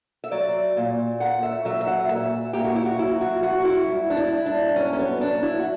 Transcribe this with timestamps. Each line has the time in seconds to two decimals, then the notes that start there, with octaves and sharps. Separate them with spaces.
0.24 E5
0.31 F#3 D5
0.77 A#2
1.20 A#2 F#5
1.43 E5
1.65 F#3 E5
1.81 E5
1.87 F#5
2.09 A#2 E5
2.53 A#2 G4
2.64 F#4
2.75 E4
2.85 F#4
2.98 F#3 E4
3.21 F#4
3.43 F#3 F#4
3.65 E4
3.87 G2
4.10 D4
4.17 E4
4.31 G2
4.46 D4
4.76 F#3 C#4
4.93 C#4
4.99 B3
5.21 F#3 D4
5.43 E4
5.59 F#4